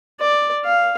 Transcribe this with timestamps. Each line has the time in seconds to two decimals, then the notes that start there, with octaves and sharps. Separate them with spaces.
0.20 D5
0.66 F5